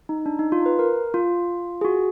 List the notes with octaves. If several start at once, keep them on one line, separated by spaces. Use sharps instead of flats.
D#4
D4
D#4
F4
B4
A#4
F4
G#4
F#4